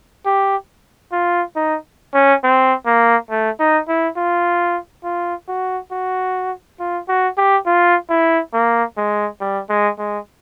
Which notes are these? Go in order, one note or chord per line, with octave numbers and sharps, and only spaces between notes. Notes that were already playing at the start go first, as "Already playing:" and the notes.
G4
F4
D#4
C#4
C4
A#3
A3
D#4
E4
F4
F4
F#4
F#4
F4
F#4
G4
F4
E4
A#3
G#3
G3
G#3
G#3